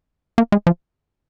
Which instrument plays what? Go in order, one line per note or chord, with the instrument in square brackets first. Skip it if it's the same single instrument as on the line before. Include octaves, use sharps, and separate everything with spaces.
[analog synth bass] A#3
G#3
F3